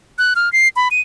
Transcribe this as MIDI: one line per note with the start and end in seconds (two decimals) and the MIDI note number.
0.18 0.34 90
0.36 0.51 89
0.52 0.68 96
0.76 0.88 83
0.91 1.01 99